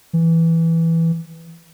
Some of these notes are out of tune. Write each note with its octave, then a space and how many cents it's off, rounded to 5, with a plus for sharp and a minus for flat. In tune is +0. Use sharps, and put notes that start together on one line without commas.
E3 +0